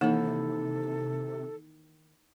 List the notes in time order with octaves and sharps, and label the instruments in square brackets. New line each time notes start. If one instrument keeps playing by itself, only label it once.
[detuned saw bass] C3 [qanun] D#3 E4 [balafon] E3 A#3 [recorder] A4